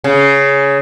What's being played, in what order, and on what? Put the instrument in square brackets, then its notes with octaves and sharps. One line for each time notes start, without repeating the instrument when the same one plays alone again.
[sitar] C#3